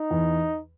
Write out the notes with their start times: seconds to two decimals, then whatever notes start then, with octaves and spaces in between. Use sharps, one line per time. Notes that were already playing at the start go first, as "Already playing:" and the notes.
Already playing: D#4
0.11 E2